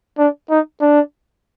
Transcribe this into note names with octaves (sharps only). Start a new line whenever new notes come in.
D4
D#4
D4